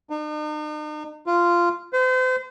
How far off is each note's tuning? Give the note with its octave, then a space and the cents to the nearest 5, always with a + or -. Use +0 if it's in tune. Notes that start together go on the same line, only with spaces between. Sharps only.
D#4 -45
F4 -10
C5 -40